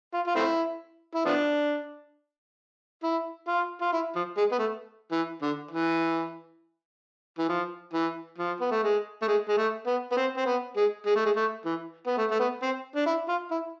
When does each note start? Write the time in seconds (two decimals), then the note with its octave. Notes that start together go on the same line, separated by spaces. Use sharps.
0.14 F4
0.27 F4
0.35 A3 C4 E4
1.15 E4
1.25 F3 B3 D4
3.03 E4
3.48 F4
3.81 F4
3.93 E4
4.15 F3
4.37 G#3
4.52 B3
4.59 A3
5.12 E3
5.42 D3
5.71 E3
7.38 E3
7.49 F3
7.93 E3
8.38 F3
8.61 B3
8.71 A3
8.83 G#3
9.22 A3
9.27 G#3
9.48 G#3
9.57 A3
9.87 B3
10.12 B3
10.17 C4
10.37 C4
10.46 B3
10.76 G#3
11.06 G#3
11.15 A3
11.25 G#3
11.36 A3
11.65 E3
12.07 B3
12.17 A3
12.31 A3
12.40 B3
12.62 C4
12.95 D4
13.06 E4
13.29 F4
13.51 E4